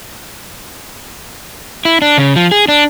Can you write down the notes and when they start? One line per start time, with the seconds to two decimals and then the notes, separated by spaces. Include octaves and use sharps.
1.85 E4
2.02 D4
2.18 C#3
2.36 F3
2.51 G#4
2.68 D4